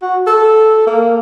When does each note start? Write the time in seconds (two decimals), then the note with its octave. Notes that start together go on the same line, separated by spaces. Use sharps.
0.02 F#4
0.27 A4
0.87 A#3